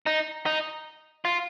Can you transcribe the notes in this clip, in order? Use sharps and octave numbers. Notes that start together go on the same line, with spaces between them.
D#4
D#4
F4